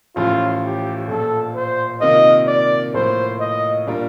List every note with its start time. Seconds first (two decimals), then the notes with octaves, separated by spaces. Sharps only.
0.16 A1 A2 F3 F4
0.63 G4
1.08 A#1 A#2 F3 A4
1.55 C5
2.01 C3 D#3 A#3 F4 D#5
2.47 D5
2.94 A2 F3 A#3 C5
3.40 D#5
3.87 A#2 G3 D4 F4 A#4